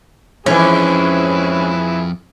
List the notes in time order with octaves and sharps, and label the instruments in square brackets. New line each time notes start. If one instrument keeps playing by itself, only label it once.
[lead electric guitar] F2 F3 [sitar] G#2 E3 [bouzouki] C#4 [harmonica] E4 G#4 B4